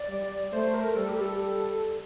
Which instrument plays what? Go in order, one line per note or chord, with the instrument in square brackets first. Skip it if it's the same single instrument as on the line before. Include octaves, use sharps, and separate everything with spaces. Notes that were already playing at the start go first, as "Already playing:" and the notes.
Already playing: [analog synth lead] D5
[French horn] G3
[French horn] A3 [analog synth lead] C5
[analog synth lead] A#4
[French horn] G3 [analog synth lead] A4
[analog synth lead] G4
A4